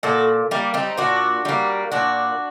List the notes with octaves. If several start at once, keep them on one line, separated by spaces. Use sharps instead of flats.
A#2 F#4 A4
G3 A#3
C4 D#4
A#2 D4 F#4
G3 A#3
A#2 D4 F#4